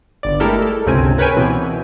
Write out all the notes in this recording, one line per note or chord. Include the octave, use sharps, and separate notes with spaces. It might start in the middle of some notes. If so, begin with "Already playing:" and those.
G1 D5
G#3 A3 E4 G4 A4 A#4
A4
G1 C#2 C3 C4 C#4 G#5
A#4 B4 C#5 G5 G#5
B2 E3 C4